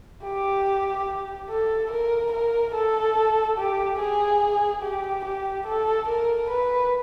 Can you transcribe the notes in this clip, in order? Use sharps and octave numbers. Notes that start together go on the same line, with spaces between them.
G4
A4
A#4
A#4
A4
G4
G#4
G4
G4
A4
A#4
B4